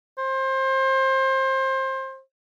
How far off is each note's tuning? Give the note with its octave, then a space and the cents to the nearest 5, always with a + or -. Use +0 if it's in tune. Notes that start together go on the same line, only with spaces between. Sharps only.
C5 +25